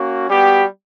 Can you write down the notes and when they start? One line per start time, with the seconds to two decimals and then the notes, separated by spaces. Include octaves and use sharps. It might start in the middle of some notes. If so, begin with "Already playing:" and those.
Already playing: A#3 C#4 F#4
0.28 G3 B3 F#4 G4